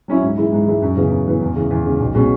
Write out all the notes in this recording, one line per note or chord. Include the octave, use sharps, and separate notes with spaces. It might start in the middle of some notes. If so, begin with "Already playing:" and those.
F#3 C#4 E4
G#2
E3 G#3 E4
G#2
E3 G#3 E4
F#2
C#3 E3 B3
F#2
C#3 E3 B3
E2
C#3 E3
E2
C#3 E3
B1
B2 G#3 C#4